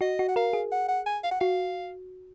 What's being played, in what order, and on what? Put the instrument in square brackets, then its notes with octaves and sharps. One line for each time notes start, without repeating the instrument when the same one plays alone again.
[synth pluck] F#4 [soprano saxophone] D#5
[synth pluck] F#4
[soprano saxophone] F#5
[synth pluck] A#4 [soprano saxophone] F5
[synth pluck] G#4
[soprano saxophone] F#5
F#5
G#5
F5
F#5
[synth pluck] F#4 [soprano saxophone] F5